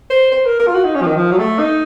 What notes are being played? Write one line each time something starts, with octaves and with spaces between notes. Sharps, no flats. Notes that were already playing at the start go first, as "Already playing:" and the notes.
C5
C5
A#4
A#4
F4
F#4
D#4
C#4
F3
D#3
F3
F#3
A3
D#4